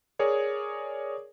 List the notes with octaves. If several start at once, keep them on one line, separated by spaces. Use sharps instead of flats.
G#4 A#4 C#5 D5